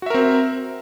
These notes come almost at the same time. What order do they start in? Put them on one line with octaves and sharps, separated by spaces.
F#4 E5 A#4 C4